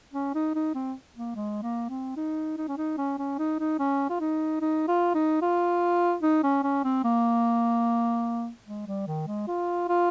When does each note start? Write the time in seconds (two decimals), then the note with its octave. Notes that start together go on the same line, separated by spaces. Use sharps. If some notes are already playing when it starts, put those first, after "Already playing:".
0.14 C#4
0.35 D#4
0.55 D#4
0.75 C4
1.16 A#3
1.36 G#3
1.63 A#3
1.90 C4
2.17 D#4
2.58 D#4
2.68 C#4
2.78 D#4
2.98 C#4
3.19 C#4
3.39 D#4
3.60 D#4
3.79 C#4
4.10 F4
4.20 D#4
4.61 D#4
4.88 F4
5.14 D#4
5.42 F4
6.23 D#4
6.44 C#4
6.64 C#4
6.84 C4
7.04 A#3
8.66 G#3
8.87 G3
9.07 D#3
9.27 G#3
9.48 F4
9.89 F4